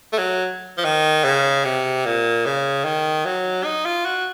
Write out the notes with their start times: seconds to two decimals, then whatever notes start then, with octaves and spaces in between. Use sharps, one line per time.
0.13 A3
0.18 F#3
0.78 F3
0.85 D#3
1.25 C#3
1.65 C3
2.06 A#2
2.46 C#3
2.85 D#3
3.26 F#3
3.65 D#4
3.85 F4
4.06 F#4